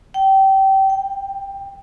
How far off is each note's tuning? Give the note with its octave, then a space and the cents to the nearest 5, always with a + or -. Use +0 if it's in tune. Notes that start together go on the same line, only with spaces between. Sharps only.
G5 -25
G5 +10